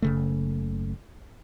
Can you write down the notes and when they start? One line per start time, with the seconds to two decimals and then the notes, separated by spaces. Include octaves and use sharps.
0.02 F#1 C#3 A3